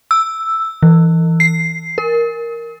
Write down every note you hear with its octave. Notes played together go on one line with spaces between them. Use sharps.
E6
E3
C7
A#4